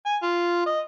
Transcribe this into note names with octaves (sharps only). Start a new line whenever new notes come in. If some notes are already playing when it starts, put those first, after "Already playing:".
G#5
F4
D#5